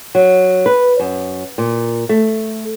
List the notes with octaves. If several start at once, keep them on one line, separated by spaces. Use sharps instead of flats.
F#3
B4
F#2
A#2
A3